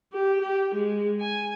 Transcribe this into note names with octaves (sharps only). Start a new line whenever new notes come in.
G4
G4
G#3
G#5